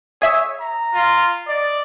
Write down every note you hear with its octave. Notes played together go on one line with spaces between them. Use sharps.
G#4 C#5 E5
A#5
F4
D5 D#5